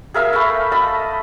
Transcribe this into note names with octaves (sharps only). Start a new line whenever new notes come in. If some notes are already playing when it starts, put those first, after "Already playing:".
G#4 A#4 E5 F5
A3 B5
D#5 A5 B5